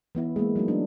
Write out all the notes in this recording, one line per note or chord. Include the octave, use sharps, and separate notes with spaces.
E3 B3 E4
G#3 A#3
F#3 A3 D#4
D4